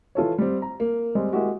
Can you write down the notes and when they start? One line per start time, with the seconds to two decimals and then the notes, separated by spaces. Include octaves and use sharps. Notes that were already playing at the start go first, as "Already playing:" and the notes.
0.15 E3 F4 A4 C#5
0.38 G3 C4
0.62 A#5
0.80 A#3
1.15 G3 G#3 C4
1.32 G#3 A#3 E4 F#4 G4